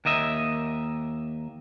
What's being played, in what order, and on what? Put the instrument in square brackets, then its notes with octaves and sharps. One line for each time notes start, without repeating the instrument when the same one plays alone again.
[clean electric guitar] D#2 A#3 D#5 E5